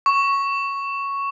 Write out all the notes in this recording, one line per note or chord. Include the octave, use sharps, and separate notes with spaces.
C#6